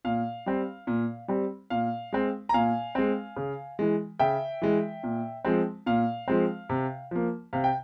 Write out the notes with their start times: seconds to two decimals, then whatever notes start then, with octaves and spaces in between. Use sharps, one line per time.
0.05 A#2 F5
0.46 G3 C4
0.87 A#2
1.28 G3 C4
1.70 A#2 F5
2.13 G#3 C4
2.49 A#5
2.53 A#2 F5 G#5
2.95 G#3 C4
3.37 C#3
3.79 E3 G#3
4.19 C#3 E5 G5
4.62 E3 G#3
5.03 A#2
5.45 F3 G#3 C4
5.86 A#2 F5
6.28 F3 G#3 C4
6.70 C3
7.11 F3 A#3
7.53 C3 F5
7.64 G5